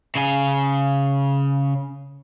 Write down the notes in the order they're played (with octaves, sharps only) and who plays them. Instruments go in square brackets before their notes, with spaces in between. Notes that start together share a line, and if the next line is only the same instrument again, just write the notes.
[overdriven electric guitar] C#3 G#5